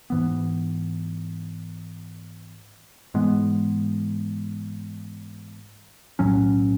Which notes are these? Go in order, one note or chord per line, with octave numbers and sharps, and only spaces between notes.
G#2 E3 B3
G#2 E3 G#3 B3
B1 A2 F#3 C#4